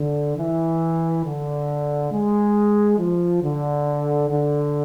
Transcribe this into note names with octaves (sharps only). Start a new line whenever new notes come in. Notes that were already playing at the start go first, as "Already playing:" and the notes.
Already playing: D3
E3
D3
G#3
F3
D3
D3